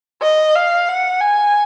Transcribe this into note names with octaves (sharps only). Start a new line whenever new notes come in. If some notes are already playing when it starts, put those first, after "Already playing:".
D#5
F5
F#5
G#5